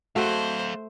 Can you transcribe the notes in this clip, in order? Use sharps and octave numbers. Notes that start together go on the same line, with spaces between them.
A3 F#4 A4 C5 F5